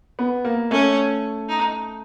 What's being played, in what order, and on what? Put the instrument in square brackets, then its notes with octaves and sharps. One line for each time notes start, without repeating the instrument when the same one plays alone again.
[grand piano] B3
A#3
[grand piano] A3 [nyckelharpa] C#4
[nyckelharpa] D#4